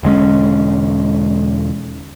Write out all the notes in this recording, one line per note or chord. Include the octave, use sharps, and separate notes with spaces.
E1 D3 G#3 C#4